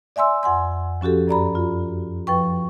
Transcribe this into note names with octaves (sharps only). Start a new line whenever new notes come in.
D5 E5 G#5 C6 E6
F2 F#5 G#5 C6
F3 C#4 F#4 G4 A4
F#2 D5 A#5 B5
F4
F3 B4 G5 C#6